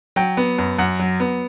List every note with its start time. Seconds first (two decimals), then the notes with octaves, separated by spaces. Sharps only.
0.16 F#3 G5
0.37 B3
0.59 F#2
0.79 F#2 F#5
0.99 F#3
1.20 B3